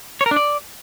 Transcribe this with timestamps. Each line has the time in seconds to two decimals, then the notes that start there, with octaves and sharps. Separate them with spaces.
0.21 C#5
0.26 A#4
0.31 D4
0.36 D5